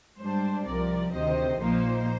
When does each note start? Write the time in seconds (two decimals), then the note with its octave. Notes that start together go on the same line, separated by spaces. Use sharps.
0.19 G#2 G3 D4 C5
0.65 C2 C3 F3 A#4 D5
1.12 D2 C3 D#3 C5 D#5
1.58 A#1 A#2 F3 A#3 D#4 C5